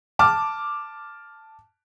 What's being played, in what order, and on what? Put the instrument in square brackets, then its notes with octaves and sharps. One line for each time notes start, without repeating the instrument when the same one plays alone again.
[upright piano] A5 D6 F6